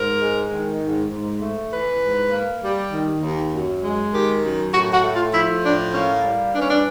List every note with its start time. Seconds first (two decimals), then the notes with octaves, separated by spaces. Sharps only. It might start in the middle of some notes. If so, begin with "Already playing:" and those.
Already playing: G#2 A#4
0.21 G#3
0.51 D#3
0.80 G#2
1.11 G#2
1.41 A3
1.71 E3 B4
2.01 G#2
2.31 A#3
2.62 G3
2.92 D#3
3.22 D#2
3.52 F#2
3.82 G#3
4.12 D#3 G4
4.42 F#2
4.73 A2 F#4
4.92 F#4
5.03 A3
5.13 F4
5.33 F3 E4
5.64 A2 D4
5.93 A#3 C#4
6.23 G3
6.54 E3 D4
6.61 C#4
6.69 D4